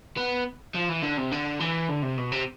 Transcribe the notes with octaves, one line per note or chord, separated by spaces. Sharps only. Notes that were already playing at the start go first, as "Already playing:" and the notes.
B3
F3
E3
D3
C3
D3
E3
D3
C3
B2
C3